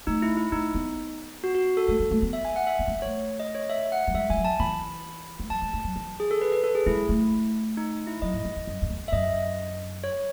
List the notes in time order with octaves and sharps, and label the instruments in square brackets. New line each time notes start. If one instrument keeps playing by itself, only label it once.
[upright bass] A3 [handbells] D#4
[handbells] E4
E4
[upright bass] A3 [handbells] D#4
[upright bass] B3
[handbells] F#4
F#4
A4
[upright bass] A3 [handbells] A4
[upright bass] G#3
A3
B3
[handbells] E5
G#5
F#5
E5
[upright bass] B3
A3
G#3
[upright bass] A3 [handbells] C#5
[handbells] D#5
C#5
E5
F#5
[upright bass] F#3
[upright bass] G#3 [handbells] E5
[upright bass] E3 [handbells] G#5
[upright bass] F#3
[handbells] A5
[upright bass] E3 [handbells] B5
[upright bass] G#3
[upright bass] F#3 [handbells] A5
[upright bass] G#3
A3
F#3
E3
[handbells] G#4
A4
B4
B4
A4
G#4
[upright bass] G#3 [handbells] E4
[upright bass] A3
[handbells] D#4
E4
[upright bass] F#3 [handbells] D#5
[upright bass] G#2
F#2
E2
F#2
F#2
E2
[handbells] E5
[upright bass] F#2 [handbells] D#5
[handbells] C#5